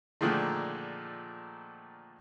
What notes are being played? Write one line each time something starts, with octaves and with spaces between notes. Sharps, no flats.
A#2 D3 D#3 F3 G#3 A3